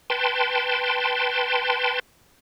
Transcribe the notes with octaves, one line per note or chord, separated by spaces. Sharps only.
B4 G5 A5 C6